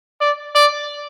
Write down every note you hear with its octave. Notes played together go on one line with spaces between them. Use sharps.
D5
D5